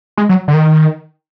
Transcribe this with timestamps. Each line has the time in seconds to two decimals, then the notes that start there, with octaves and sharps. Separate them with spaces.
0.17 G#3
0.29 F#3
0.48 D3
0.54 D#3